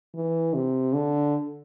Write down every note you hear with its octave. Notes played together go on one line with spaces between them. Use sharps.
E3
C3
D3